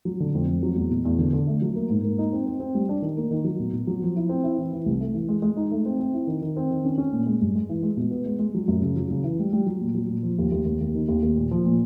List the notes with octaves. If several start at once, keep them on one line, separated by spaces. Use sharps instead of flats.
F#3
D3
F2
F2
F#3
E2
B2
E2
D3
D3
A3
F#3
A#3
G#2
A#3
D#4
C4
C4
C4
G3
D4
D#3
A#3
D#3
F#3
B2
B2
F#3
F3
E4
C4
E4
E3
E3
C2
A3
E3
G#3
G#3
D#4
A3
C4
C4
E4
D#3
D#3
C4
D#3
C#4
C#4
A#2
G#3
G2
G#3
E3
G#3
B2
B3
G#3
G#3
F#3
F#2
C#3
F#3
C#3
E3
G3
G3
F#3
A#2
F#3
A#2
F3
D#2
D#2
D#2
D#2
D#3
D#2
D#2
A#2
F3
A#2